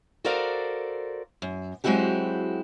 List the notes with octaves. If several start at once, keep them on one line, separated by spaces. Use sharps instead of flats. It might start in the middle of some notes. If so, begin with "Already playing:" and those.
F#4 A4 A#4 C5 D5 F5
F#2
F#3 G#3 C4 E4 F#4 G4